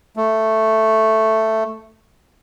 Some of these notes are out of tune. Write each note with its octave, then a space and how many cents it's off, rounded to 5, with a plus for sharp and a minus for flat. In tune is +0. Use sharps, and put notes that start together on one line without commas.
A3 +5